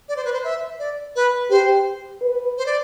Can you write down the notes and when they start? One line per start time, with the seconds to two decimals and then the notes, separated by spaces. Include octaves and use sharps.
0.09 D5
0.16 C5
0.25 B4
0.33 C5
0.44 E5
0.79 D5
1.16 B4
1.50 G4 C5
2.22 B4
2.58 C5
2.66 D5